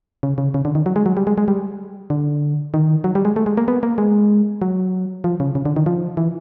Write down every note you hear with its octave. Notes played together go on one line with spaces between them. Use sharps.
C#3
C#3
C#3
D3
D#3
F#3
G#3
F#3
G3
G#3
G#3
G3
D3
D#3
F#3
G3
G#3
A3
G#3
A#3
B3
A#3
G#3
F#3
F3
C#3
C#3
D3
D#3
F3
E3